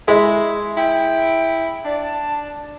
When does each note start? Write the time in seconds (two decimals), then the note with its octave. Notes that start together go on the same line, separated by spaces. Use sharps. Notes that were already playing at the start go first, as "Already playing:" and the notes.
0.08 G#3 E4
0.77 E4 G5
1.85 D4 D5
2.03 A5